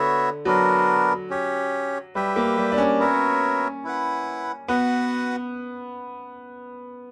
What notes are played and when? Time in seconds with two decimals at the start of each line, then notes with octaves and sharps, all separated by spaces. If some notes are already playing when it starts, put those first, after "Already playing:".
Already playing: D3 B3 F#4 C#5 E5
0.45 F#3 B3 D4 F#4 A#4
1.30 C#4 G4 C#5
2.15 G3 G4 B4 E5 G5
2.36 A#3
2.57 G3
2.72 D4
2.78 C#4
2.99 B3 F#4 A#4 C#5 E5
3.84 E4 B4 F#5
4.68 B3 F#4 B4 F#5